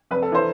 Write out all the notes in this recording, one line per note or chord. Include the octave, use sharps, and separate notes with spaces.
F1 B4
A4
E3 C5